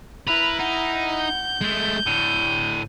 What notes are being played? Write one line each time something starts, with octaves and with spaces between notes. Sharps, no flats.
E4 A#4 B4 F7
D#4 F#5
G6
G#3 A3
A2 D3 D#7